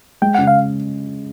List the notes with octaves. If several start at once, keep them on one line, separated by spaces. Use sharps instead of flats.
G#3 G5
C#3 F#5
F5